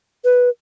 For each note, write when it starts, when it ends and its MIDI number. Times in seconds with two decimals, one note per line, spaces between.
0.25 0.49 71